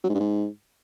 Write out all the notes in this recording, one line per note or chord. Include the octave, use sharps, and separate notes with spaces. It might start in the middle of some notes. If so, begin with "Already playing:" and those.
F#3
G#2
G2
G#2